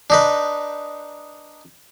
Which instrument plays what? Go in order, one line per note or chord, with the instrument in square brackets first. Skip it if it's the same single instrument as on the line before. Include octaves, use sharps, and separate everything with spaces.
[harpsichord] D4 D#4 B4